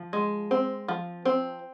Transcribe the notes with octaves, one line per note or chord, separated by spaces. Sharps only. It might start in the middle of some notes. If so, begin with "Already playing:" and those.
Already playing: F3
G#3
C4
F3
C4